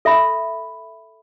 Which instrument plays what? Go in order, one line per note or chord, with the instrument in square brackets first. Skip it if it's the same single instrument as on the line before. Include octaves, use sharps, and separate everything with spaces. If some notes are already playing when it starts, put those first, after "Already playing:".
[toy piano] A4 E5 B5